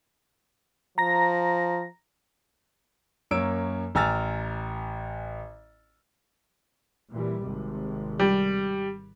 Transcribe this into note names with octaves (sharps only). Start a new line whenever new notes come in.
F3 A#5 A#6
F#2 A#3 C#5 E6 D7
A1 G#5 A#5 E6 F6 A6
A#2 E3 G3
G#1 C3
G3